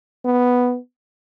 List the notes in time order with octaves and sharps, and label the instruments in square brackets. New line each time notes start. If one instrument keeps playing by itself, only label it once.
[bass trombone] B3